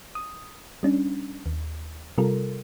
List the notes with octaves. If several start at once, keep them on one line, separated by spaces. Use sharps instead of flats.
D#6
G3 C#4 D4
D#2
C3 G3 F4 A4 A#4